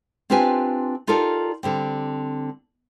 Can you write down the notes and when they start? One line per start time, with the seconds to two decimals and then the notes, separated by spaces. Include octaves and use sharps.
0.30 C4 D4 F4 G4 B4 G#5
1.07 D#4 F4 G4 A4 A#4 D5
1.63 D3 G3 C4